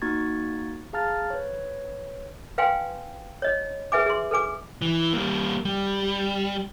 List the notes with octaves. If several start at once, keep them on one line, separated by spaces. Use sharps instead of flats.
A#3 D#4 F#4 C#6 G#6 A6
G#4 F5 A5 A#5 F6 A6
B4 C#5
B4 F5 G5 G#5 C6
C#5 D#5
G#4 B4 E5 G#5 D6
G#4 C6
A4 B4 G#5 D6
E3
G3 A#3
G3